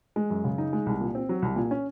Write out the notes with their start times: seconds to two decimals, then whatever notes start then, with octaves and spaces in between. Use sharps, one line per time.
0.16 G#3
0.30 F#2
0.44 C#3
0.58 D#4
0.73 G#3
0.86 C2
1.01 A#2
1.15 C4
1.29 F#3
1.42 C2
1.56 A#2
1.71 C#4